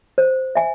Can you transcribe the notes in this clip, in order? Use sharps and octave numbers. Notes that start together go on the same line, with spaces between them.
C5
E5 G#5